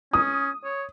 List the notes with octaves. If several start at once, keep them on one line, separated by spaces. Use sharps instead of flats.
C#4 D#6
C#5